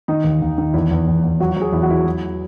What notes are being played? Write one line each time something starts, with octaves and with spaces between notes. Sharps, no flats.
D#3 D#4
D#2
D#2
D#3
E2 E4
E2
E2
E2
F#3 F#4
F#4
F#3 G#4
E2 E4
F#4
F#3 E4
F#3